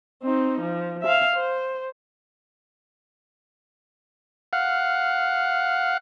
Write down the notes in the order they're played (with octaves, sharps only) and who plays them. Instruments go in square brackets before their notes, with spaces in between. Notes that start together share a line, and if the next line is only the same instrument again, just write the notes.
[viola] C4 D#4
F3
E5 F5
C5
[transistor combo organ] F5 F#5